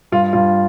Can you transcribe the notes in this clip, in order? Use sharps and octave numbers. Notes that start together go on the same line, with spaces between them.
G2 F4
G2 F4